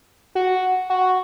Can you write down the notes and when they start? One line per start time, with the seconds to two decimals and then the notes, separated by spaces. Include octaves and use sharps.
0.35 F#4
0.90 F#4